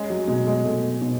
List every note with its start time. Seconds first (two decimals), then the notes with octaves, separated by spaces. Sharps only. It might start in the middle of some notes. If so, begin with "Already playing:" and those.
Already playing: G#3 C#4
0.10 F#3
0.27 B2 G#3
0.47 G#3
0.65 B2 A3
1.01 B2